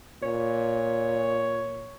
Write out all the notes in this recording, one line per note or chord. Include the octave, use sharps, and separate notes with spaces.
A#2 C#5